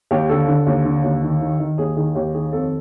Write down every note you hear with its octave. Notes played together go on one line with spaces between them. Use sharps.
D#2 G4
D3 A4
D3
D#2
D3
D#2
D#3
D#3
D#3
D#2 G#4
D#3 G#4
D#2 G4
D#3 G#4
F2 A4